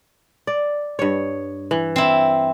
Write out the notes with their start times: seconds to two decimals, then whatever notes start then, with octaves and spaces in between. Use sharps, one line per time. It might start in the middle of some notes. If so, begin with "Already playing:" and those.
0.47 D5
0.99 G2 C#5
1.71 E3
1.96 C4 E4